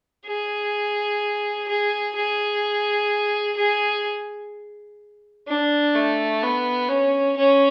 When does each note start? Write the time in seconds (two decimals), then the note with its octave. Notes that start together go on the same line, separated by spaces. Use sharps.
0.26 G#4
1.68 G#4
2.16 G#4
3.57 G#4
5.47 D4
5.95 A3
6.42 B3
6.89 C#4
7.37 C#4